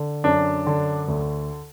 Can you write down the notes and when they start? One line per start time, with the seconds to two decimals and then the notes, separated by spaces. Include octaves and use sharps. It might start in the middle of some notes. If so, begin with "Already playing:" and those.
Already playing: D3
0.24 F#2 D4
0.67 D3
1.08 D2